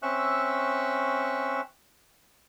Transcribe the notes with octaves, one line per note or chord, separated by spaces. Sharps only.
C4 C#4 E5 C#6 E6 F#6